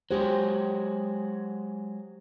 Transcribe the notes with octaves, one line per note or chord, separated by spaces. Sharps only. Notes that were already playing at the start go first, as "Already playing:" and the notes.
F#3 G#3 F#4 G4 C5